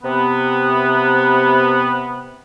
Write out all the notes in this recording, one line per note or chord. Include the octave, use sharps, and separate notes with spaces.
C3 B3